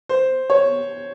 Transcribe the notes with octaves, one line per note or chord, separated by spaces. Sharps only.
C5
C#5